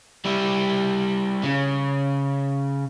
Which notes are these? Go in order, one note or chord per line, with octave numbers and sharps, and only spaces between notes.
G3 E4
C#3